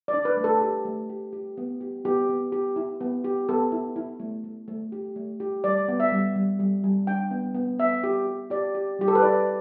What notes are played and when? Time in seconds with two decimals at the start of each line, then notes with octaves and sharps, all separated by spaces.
0.08 D5
0.14 D4
0.25 B4
0.37 A3
0.44 A4
0.61 G4
0.85 A3
1.10 G4
1.33 G4
1.57 B3
1.81 G4
2.05 B3 G4
2.29 B3
2.52 G4
2.76 E4
3.01 B3
3.24 G4
3.49 B3 A4
3.72 E4
3.96 E4
4.20 A3
4.44 A3
4.68 A3
4.92 G4
5.16 A3
5.40 G4
5.64 G3 D5
5.88 B3
6.00 E5
6.12 G3
6.36 G3
6.59 G3
6.84 G3
7.07 D4 G5
7.31 B3
7.55 B3
7.79 B3 E5
8.04 G4
8.27 G4
8.50 G4 D5
8.75 G4
8.99 G3 G4
9.08 A4
9.15 B4
9.22 E4 D5